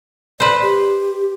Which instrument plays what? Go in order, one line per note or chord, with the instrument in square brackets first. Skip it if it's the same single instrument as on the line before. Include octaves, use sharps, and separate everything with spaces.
[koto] B4 C5 [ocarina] D5
[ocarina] G4